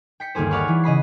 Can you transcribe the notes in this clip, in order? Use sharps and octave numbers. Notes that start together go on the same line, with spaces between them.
G5 B6 C#7
G1 D#2 A#3 G#4 C5
C#5 D5 F5 F#5 B5 C#6
E3
C#3 D#5 B5 C7